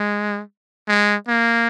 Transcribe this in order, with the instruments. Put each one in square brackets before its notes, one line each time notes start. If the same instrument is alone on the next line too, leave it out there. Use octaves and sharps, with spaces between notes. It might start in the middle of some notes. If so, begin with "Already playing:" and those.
Already playing: [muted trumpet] G#3
G#3
A#3